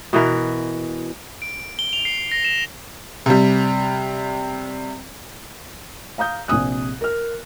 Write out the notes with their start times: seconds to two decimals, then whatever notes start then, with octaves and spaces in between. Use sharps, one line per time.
0.13 B2 E3 A#4
1.42 D7
1.79 G7
1.93 F7
2.05 C7
2.32 A#6
2.45 E7
3.26 C3 G3
6.18 F5 A#5 D#6 G6
6.48 A#1 C3 G#5 D#6 F#6
7.01 A#4 F6